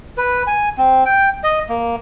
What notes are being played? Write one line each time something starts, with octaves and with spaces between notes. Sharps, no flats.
B4
G#5
C4
G5
D#5
A#3